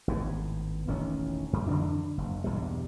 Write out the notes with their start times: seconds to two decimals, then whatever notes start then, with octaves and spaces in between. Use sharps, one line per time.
0.08 G#1 A2 B3
0.87 E1 A1 D#3 C#4
1.53 F#2
1.68 F2 D3 E3 D4
2.18 F#1
2.44 B1 E2 G2 G3